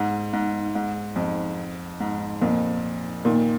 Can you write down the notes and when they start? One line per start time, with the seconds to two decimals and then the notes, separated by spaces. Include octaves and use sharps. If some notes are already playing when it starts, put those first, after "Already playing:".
Already playing: G#2
0.33 G#2
0.75 G#2
1.16 F2
2.00 G#2
2.41 F2 A#2
3.25 A#2 D#3